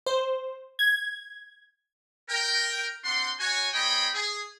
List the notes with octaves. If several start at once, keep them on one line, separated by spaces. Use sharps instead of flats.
C5
G#6
A#4 G5
C4 D4 F#5 C6
F#4 C#5 G#5
C4 G#4 C#5 D#5 G5 B5
G#4